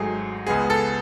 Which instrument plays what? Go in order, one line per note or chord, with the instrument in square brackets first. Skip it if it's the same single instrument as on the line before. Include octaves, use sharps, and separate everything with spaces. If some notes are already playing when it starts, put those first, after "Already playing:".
Already playing: [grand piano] G#1 G#2 F#3 A3 G#4
C#2 C#3 G#3 B3 G#4
A4